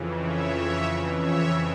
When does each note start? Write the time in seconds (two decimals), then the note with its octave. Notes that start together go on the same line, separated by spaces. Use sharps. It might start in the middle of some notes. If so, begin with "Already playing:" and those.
Already playing: F2 C#3 E3
0.23 C#5 E5
0.56 C#5 E5
1.20 C#5 E5